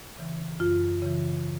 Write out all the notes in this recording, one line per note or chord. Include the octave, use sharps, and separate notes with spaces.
C#3 E3
F#2 F4
C#3 E3